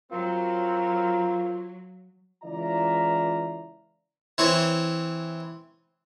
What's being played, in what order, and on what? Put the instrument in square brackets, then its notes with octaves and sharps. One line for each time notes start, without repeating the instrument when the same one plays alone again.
[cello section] F#3 [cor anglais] C4 [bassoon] F4 [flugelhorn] A#4
[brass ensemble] C#2 E3 F4 D5 E5 A#5
[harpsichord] E3 C4 C#5